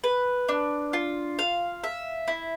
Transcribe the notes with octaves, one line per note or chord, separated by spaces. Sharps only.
B4
D4
F4
F5
E5
E4